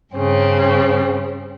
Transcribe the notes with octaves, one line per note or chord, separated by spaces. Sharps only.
G2 C#3 C4 C#4